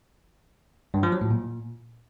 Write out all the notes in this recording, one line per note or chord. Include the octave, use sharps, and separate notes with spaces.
G2
F3
F#3
A2
A#2